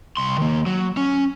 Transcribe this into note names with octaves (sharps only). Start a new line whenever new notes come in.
C2 C6
D#3 A#3
F#3
C#4